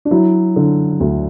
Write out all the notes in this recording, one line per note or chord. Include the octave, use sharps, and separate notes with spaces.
D4
F#3 E4
D3
D2